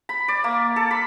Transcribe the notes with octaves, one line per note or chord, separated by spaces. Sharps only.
B5
D5
A#3
A4
B5